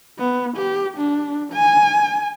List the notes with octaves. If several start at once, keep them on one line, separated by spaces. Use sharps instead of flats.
B3
G4
D4
G#5